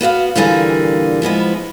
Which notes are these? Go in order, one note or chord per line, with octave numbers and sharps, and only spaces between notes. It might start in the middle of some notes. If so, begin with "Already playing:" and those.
B3 F#4 E5 F5
A#2 D3 E3 G3 A#3 G#4
F3 G#3 B3 E4